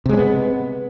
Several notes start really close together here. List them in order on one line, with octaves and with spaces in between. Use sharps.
C3 G#3 C#4 B3